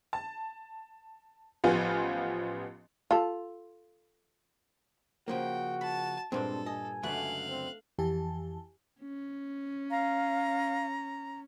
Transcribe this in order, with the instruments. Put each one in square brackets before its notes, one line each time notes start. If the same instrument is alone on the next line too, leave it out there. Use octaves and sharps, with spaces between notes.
[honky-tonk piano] A5
A1 F3 B3 F4 G4 G#5
[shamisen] F4 A4
[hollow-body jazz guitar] C#3 F3 A#3 [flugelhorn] F#4 [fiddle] G5
[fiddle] A5 [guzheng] B5
[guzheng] G2 A#2 D4 [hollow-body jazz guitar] G#3 C4 [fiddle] A4
[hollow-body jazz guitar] D#5 [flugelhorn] G#5
[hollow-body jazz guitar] C#2 F#2 D3 [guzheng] A3 F#4 B4 [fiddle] F5 F#6
[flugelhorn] C4
[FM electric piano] F2 E3 G4 G#5 A5
[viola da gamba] C#4
[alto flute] F5 [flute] A#5